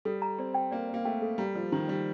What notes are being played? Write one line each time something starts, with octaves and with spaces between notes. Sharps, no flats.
G3 A4
A#5
C4 D5
G5
A#3 D5
D5
A#3
A3 G5
A4
G3 A#5
F3 D5
D#3 A#5
G3 D5